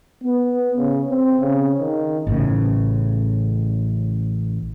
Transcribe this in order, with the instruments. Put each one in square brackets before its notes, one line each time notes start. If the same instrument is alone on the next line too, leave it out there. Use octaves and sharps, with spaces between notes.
[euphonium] B3
C#3
C4
C#3
D#3
[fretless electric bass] A1 A2 C#3